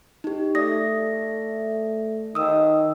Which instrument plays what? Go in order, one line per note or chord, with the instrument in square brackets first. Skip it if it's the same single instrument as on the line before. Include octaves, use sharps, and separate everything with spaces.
[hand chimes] D#4 G4
[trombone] A3 [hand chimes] D5 D#6 A#6
[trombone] D#3 [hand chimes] D#6 E6